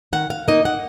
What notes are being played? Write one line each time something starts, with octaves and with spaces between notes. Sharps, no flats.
D#3 F#5
F5
A#3 D#4 D#5
F#5